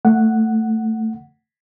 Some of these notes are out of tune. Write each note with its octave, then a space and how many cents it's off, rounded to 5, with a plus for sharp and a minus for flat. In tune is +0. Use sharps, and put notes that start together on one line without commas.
A3 +15 F#5 +0